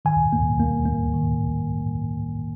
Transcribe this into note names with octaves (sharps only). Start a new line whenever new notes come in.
D#3 G#5
A#3
A#3
A#3
D#3